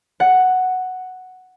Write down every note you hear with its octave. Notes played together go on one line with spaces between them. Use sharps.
F#5